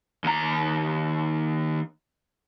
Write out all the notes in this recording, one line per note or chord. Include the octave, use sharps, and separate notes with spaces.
D#2 A#5